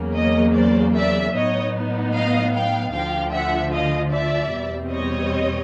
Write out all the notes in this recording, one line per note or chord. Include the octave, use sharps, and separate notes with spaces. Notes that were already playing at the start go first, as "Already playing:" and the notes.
Already playing: E2 C#3 F#3 A#3
C#5 D#5
C5 D5
D5 E5
A2 F#3 B3 D#4 C#5 D#5
D#5 F5
F5 G5
D2 D3 F3 F5 G5
E5 F#5
D#5 F5
D5 E5
E2 B2 G3 C4
C#5 D#5